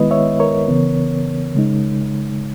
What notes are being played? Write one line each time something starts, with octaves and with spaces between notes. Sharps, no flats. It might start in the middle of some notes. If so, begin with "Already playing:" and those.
Already playing: D#3 G#3 B3 E4 B4 D#5
C#5 E5
A#4 C#5
C#3 E3 B3
C#3 G#3 D#4